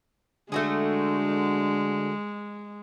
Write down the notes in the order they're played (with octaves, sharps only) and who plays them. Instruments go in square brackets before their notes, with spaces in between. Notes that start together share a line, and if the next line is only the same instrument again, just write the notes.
[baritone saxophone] D3 [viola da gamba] G#3 [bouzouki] A3 F#4 G#4